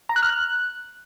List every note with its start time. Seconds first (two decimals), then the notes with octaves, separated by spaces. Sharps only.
0.09 A#5
0.16 F#6
0.23 F6
0.29 F#6